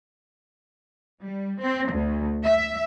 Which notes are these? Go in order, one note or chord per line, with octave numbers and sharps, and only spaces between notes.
G3
C4
D2
E5